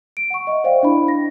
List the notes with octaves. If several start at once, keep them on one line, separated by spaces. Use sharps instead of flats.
D7
F#5 C#6
D#5 E5
C5 D5 D#5 F5 G5
D4 E4 B5
A#6